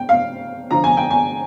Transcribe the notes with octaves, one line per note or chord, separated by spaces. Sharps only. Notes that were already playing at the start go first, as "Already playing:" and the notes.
Already playing: G5
F5
D3 F3 A#5
G#5
G5
G#5